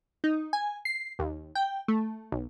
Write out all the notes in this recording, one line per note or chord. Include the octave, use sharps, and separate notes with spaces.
D#4
G#5
C7
D#2
G5
A3
B1